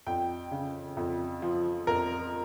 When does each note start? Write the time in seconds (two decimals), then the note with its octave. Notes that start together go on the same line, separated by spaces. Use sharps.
0.07 F2 G5
0.51 C#3
0.97 F2
1.42 F3
1.87 F2 A#4